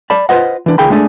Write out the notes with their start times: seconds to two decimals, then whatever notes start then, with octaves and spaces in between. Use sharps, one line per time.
0.10 D5 A5 B5
0.29 F4 B4 C5 D#5 F#5
0.66 E3 D4
0.78 C#2 D#3 G#4 G5 B5
0.90 G#3 A3 D4 G#4 D5